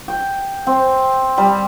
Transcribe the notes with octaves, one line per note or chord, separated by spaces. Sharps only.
G5
C4
G3